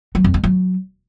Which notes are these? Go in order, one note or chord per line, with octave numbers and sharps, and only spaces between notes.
F#3
F2
G#3
F#3